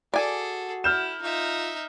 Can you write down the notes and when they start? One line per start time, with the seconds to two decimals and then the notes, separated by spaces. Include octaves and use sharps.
0.14 F#4 G#4 A4 D5 G#5
0.84 E4 F6 G6 E7
1.22 D#4 F4 E5